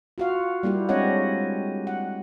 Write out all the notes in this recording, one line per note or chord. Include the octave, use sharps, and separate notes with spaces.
F4 F#4 F5
G3 A#3 E4 G4
G#3 C4 D4 C#5 D#5 F#5
F#5